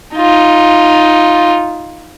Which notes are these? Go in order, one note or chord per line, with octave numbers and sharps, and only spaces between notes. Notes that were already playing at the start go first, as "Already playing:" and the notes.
D#4 F4